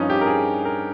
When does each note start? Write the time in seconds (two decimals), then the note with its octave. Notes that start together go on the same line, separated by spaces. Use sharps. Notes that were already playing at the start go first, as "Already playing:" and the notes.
Already playing: G2 F3 C#4 D#4
0.10 G4
0.21 A#4
0.27 G#4
0.65 A#4